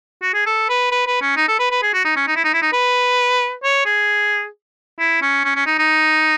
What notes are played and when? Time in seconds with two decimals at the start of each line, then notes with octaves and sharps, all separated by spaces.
0.22 F#4
0.34 G#4
0.46 A4
0.69 B4
0.91 B4
1.07 B4
1.22 C#4
1.37 D#4
1.48 A4
1.59 B4
1.71 B4
1.83 G#4
1.94 F#4
2.05 D#4
2.16 C#4
2.28 D#4
2.36 E4
2.45 D#4
2.54 E4
2.62 D#4
2.73 B4
3.63 C#5
3.86 G#4
4.99 E4
5.22 C#4
5.45 C#4
5.56 C#4
5.67 D#4
5.79 D#4